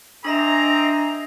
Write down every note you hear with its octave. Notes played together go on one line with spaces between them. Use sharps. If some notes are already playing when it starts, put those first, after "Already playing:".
C4 D4 G#4 D#5 E5 A#5